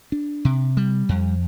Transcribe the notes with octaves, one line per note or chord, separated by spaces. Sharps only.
D4
C3
G3
F2